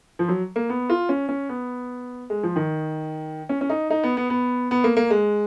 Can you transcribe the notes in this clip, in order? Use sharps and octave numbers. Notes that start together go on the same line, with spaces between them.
F3
F#3
A#3
B3
F4
C#4
C#4
B3
G#3
F3
D#3
C#4
C#4
D#4
D#4
B3
B3
B3
B3
A#3
A#3
G#3